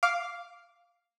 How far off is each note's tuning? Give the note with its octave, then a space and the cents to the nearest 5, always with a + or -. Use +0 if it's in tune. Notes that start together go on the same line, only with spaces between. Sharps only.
F5 +0 D6 -10